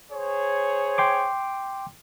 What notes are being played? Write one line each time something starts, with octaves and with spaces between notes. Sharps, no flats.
G#4 C5 C#5
G5 C6 D6